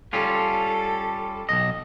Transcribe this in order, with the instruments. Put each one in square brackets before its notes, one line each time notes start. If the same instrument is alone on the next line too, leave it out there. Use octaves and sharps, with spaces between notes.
[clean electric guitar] G3 C#4 F4 [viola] A4
[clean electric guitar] B1 G#2 D#5